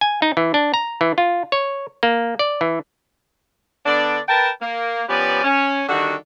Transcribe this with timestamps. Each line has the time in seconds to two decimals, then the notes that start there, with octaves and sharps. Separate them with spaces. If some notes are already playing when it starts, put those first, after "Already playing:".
0.01 G#5
0.22 D#4
0.37 E3
0.54 D4
0.74 A#5
1.01 E3
1.18 F4
1.52 C#5
2.03 A#3
2.39 D5
2.61 E3
3.86 D3 B3 D4 D5
4.28 A#4 B4 G5 A5
4.62 A#3
5.08 F3 B3 C#4 G4 B4 D5
5.44 C#4
5.89 D3 D#3 G3 F#4